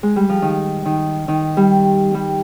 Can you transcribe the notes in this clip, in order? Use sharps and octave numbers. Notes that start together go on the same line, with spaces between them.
G#3
G3
F3
D#3
D#3
D#3
G3
G3